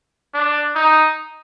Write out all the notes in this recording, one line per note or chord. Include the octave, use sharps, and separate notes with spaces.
D4
D#4